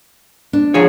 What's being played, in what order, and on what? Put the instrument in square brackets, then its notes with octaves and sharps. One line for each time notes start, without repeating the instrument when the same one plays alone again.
[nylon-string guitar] D4
[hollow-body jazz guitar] F3 G#4 C#5